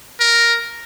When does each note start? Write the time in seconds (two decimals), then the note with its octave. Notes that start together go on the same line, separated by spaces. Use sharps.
0.20 A#4